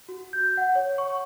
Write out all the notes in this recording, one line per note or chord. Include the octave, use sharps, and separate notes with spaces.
F#4
G6
F#5
C#5
C#6